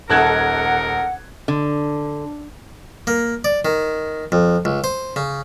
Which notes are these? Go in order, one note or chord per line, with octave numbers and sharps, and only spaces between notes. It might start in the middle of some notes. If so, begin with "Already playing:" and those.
D#1 G#3 D#4 A4 A#4 F#5 F#6 G#6
D3
A#3
D5
D#3
F2
C#2
C5
C#3